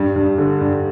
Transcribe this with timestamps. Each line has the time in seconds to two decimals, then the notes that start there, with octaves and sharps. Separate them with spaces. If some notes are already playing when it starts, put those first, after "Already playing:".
Already playing: G2
0.16 G2
0.38 D3
0.61 G2